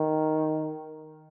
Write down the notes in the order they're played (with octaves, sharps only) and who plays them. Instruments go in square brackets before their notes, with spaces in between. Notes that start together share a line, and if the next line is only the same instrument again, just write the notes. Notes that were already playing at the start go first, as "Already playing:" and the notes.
Already playing: [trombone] D#3